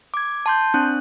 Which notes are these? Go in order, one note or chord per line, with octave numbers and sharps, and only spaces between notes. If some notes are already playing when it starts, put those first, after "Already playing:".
D6 G#6
A5 C6 G6
C4 D4 F#6